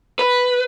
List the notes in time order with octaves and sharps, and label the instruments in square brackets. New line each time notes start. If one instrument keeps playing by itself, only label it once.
[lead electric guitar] B4